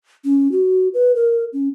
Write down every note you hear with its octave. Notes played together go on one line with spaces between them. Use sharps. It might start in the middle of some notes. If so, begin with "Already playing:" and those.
C#4
F#4
B4
A#4
C#4